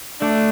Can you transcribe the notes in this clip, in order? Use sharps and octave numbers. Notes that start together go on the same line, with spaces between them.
A3 D4